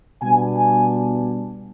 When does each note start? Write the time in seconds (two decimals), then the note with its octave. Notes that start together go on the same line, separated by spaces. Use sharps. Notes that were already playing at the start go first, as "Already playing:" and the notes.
0.21 B2 G3 B3 D4 G#5
0.56 G#5